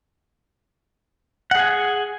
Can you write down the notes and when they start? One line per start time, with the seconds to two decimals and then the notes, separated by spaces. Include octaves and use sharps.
1.51 F#5
1.55 G#4
1.59 G#5